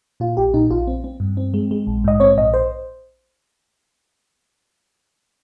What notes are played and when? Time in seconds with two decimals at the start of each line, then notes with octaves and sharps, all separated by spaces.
0.20 A#2 F4
0.37 A#1 G4
0.54 A#2 D#4
0.70 A#1 F4
0.87 C4
1.04 C4
1.20 G2
1.37 C4
1.54 G#3
1.71 G#3
1.87 A#1
2.04 G#2 D#5
2.20 C4 C#5
2.37 A#1 D#5
2.54 C5